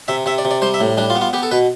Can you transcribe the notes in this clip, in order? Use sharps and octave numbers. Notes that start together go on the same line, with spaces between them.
C3 E5
C3 E5
D5
C3
D5
G3 C5
E5
A2
G3 D4
F4
B3
F4
B3 G4
A4
B2 B4